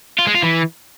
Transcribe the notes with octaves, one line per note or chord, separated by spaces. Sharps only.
F4
G#3
F4
E3